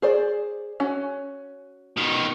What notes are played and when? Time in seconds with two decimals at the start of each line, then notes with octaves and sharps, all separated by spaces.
0.02 G#4 C5 D5
0.80 C#4 F#4
1.97 B2 D#3